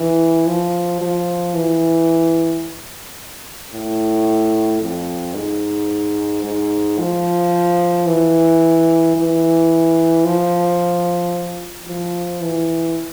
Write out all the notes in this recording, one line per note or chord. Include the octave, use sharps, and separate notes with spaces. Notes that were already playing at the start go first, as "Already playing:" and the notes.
Already playing: E3
F3
F3
E3
A2
F2
G#2
G#2
F3
E3
E3
F3
F3
E3